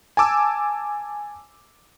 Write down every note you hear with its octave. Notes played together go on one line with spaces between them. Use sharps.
G#5 A5 D6 E6